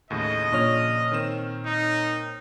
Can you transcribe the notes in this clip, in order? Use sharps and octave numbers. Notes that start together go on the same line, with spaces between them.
D#2 A2 C#3 D#5
A#2 C#3 F3 D4 C#5 F6
D#3 C4 E7
D#4